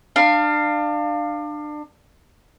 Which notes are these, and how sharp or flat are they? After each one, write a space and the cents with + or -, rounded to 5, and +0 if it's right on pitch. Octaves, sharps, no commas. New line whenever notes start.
D4 +30 F5 +0